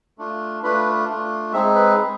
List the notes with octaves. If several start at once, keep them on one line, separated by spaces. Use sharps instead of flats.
A3 D4 F4
A3 D4 F4 B4
A3 D4 F4
G#3 C4 D#4 G#4 E5
B4
G#3 C4 D#4 G#4